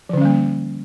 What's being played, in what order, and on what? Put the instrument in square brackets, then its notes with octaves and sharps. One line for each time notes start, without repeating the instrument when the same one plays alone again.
[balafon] F3
D3
C#4
G3
A#3